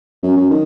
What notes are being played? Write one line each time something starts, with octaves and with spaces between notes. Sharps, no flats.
F#2
F#2
D#3